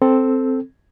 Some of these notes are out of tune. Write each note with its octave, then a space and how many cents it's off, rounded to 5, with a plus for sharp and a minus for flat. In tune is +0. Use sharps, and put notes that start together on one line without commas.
C4 +0 A4 +0